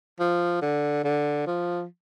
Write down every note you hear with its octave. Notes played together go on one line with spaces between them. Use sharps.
F3
D3
D3
F3